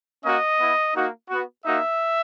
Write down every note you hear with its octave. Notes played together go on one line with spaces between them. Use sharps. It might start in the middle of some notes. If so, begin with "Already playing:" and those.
A#3 C#4 F#4 D#5
B3 E4
A#3 D#4 F#4
B3 F#4
A#3 D#4 F#4 E5